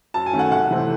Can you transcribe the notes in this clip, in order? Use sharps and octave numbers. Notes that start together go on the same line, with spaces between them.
F#2 A5
G#5
D#3 A3 C#4
F#5
C2 F#5
C3 E3 A3 C4